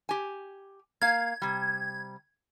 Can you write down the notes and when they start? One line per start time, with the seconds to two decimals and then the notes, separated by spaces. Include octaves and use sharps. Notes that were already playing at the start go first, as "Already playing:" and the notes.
0.09 G4 G#5
1.02 A#3 F5 G#6
1.42 C3 G3